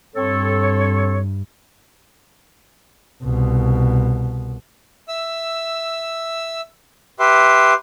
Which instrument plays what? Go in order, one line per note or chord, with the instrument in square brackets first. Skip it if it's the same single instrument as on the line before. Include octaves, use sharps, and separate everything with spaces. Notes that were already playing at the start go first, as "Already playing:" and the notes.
[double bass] G2 [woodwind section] C4 A4 C#5
[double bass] C2 B2
[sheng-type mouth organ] E5 E6
G4 B4 E5 C6